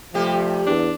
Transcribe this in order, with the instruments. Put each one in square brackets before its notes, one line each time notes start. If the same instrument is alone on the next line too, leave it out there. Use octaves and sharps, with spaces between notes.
[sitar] C3 G3 G4 [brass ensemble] F3 A3
[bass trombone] E2 [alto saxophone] D4